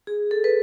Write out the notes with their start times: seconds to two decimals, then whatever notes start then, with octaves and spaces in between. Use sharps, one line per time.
0.07 G#4
0.31 A4
0.44 B4